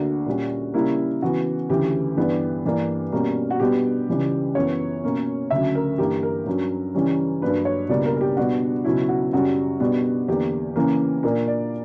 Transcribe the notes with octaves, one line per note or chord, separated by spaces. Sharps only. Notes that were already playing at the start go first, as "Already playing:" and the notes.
Already playing: D2 D3 A#3 D4 F#4
A#2 G3 C#4
C#3 G3 A#3 E4
C#3 E3 B3 F#4
D2 C#3 E3 G4
G2 E3 G3 B3 D4
G2 E3 A#3 D4
B2 G3 A#3 C#4
F#4
B2 G3 B3 D4 G4
C#2 C#3 E3 G3
F#2 E3 B3 C#5
B2 A#3 C#4
D2 C#3 F#3 E5
A#4
G2 E3 A#3 G4
A#4
G2 F#3 C#4
C#3 E3 G3 C#4
G2 F#3 A#3 D4 B4
C#5
C#2 B2 G3 A#3 D4 D5
A#4
A#4
G4
B2 G3 B3 D4 F#4
C#2 B2 F#3 C#4 E4
F#4
F#2 C#3 G3 C#4 F#4
B2 G3 B3 D4
E2 D3 A#3 D4 G4
C#3 E3 A#3 C#4
A#2 A#3 D4 A#4
D5